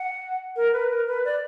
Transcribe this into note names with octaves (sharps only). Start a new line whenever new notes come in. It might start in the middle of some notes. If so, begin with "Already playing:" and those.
Already playing: F#5
A#4
B4
A#4
B4
D5